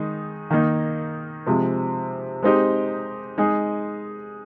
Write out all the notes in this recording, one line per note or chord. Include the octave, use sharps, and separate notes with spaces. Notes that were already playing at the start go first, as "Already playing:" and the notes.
Already playing: D#3 G#3 D#4
D#3 A#3 D#4
C3 F3 G#3
G#3 C4 D#4 G4
G#3 D#4 G#4